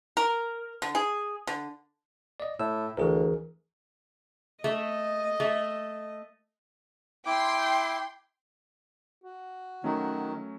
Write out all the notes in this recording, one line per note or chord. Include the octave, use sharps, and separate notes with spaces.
A#4
D3
G#4
D3
D5 D#5
A2 E6
D2 E3 G#4 A#4
A3 D#5
A3
E4 G5 C6 D6
F#4
D#3 F#3 A3 C#4